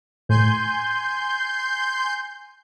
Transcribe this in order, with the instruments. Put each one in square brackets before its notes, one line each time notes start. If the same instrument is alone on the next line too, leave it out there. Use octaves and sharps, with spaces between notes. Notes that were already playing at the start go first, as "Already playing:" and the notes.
[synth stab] A2 [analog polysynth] G#5 C6 G6